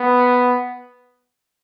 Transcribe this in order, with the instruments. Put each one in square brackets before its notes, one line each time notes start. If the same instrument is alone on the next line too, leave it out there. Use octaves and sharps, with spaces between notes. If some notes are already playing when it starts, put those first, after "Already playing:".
Already playing: [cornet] B3